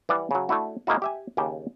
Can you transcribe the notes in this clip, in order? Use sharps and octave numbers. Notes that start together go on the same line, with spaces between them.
E3 G3 D5 F#5
C#3 F#3
A3 D4 E4 F#4
G#3 A#3 D#4 E4 F#4
G4 E5 G#5
D#2 C#3 G4 G5 A5